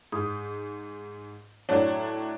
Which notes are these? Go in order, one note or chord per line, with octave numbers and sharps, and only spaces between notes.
G#2 D#6
A2 F#3 D4 C#5